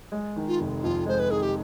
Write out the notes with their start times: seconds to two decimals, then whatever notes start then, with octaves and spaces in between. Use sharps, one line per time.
0.12 G#3
0.36 D#3
0.48 F4
0.59 F1
0.83 F2 F4
1.06 G#3 C5
1.19 B4
1.31 D#3 G#4
1.42 G4